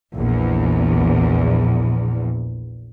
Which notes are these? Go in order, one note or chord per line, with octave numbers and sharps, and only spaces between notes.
A#1 E2